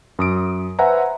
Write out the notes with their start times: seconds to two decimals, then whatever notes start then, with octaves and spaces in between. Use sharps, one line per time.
0.19 F#2 D#6 D7
0.79 B4 C5 E5 F#5 G#5 A#5